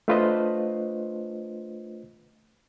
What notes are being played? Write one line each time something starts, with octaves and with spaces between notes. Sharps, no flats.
A3 D4 F4 B4 C5 D#5